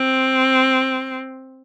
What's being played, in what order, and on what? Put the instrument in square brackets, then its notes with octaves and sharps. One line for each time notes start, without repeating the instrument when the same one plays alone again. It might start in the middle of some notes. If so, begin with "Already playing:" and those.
Already playing: [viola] C4